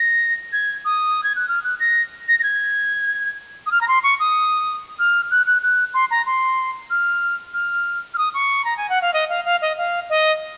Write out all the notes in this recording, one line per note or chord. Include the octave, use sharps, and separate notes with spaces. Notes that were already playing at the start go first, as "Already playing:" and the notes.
Already playing: A#6
G#6
D#6
G#6
F#6
F6
F#6
A#6
A#6
A#6
G#6
D#6
F6
A#5
C6
C#6
D#6
F6
F#6
F#6
F#6
C6
A#5
C6
F6
F6
F6
D#6
C#6
A#5
G#5
F#5
F5
D#5
F5
F5
D#5
F5
D#5